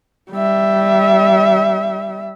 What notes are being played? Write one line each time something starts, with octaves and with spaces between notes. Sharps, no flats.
G3 E5